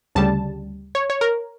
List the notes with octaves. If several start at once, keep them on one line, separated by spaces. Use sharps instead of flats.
D2 C#3 G3 A5
C#5
C#5
A#4